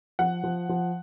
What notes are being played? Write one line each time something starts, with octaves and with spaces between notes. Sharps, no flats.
F3 F#5
F3
F3